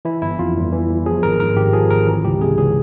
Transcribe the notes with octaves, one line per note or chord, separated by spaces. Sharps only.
E3 E4
G1 E4
F2 F4
G1
E3
G1
F3 G#4
G#1 A#4
G#2 A#4
G#1 G4
F3 G#4
G#1 A#4
E3
C#2 G4
C3 G#4
C#2 G#4